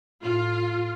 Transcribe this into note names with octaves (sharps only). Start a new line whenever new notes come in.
A2 F4